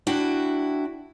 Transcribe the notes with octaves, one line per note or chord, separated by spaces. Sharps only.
D4 E4 F#4 G5